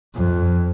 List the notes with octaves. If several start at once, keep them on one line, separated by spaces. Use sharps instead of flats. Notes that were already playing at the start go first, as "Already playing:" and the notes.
F2